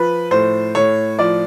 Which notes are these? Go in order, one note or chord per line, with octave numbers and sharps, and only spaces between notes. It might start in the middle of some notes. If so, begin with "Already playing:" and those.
Already playing: F3 B4
A2 C5
A2 C#5
F3 D5